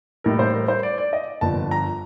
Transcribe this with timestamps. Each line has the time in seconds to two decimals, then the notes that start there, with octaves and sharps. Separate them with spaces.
0.24 A1 A2 G3 A#4
0.39 C5
0.54 A#4
0.68 C5
0.83 D5
0.98 D5
1.13 D#5
1.41 G1 G2 F3 A5
1.71 A#5